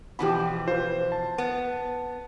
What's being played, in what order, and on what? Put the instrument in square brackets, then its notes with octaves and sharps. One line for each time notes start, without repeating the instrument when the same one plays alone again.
[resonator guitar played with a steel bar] B2 E3 F3 [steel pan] G4 B5
[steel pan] F4 B4 [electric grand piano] C5
[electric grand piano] A5
[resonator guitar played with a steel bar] B3